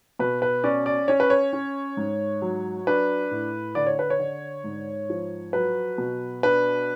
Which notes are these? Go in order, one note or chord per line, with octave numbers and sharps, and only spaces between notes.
B2 B4
B4
C#4 D5
D5
C#4 C#5
B4
C#5
C#4
G#2
F#3
D4 B4
A2
D3 D5
C#5
B4
C#5
D3
G#2
F3
F#3 B4
B2
D4 B4